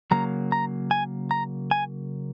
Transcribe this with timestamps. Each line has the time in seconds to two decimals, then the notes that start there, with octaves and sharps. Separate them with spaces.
0.11 C#3 F#3 A#3 A#5
0.52 A#5
0.91 G#5
1.31 A#5
1.71 G#5